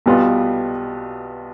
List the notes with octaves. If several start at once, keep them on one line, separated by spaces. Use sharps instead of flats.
B1 B2 G3 B3 F4